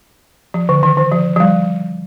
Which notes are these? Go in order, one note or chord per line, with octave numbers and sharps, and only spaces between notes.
F3
D3
D#3
D#3
F3
F3
G3